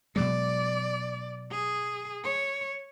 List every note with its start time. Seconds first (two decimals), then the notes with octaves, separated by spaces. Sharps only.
0.16 B2 F#3 G#3 D5
1.51 G#4
2.24 C#5